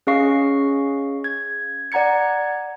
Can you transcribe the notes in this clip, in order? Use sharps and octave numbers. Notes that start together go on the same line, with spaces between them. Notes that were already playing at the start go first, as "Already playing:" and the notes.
C#4 G#4 D#5 F5 C#6 C7
G#6
D5 F#5 A#5 G#6 C#7